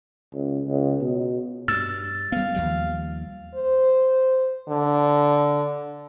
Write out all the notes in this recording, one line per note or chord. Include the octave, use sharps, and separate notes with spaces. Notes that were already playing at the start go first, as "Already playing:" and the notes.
C#2
C#2
B2
G2 E6 A6
G3 B3 F5
D#2 F3 G3
C5
D3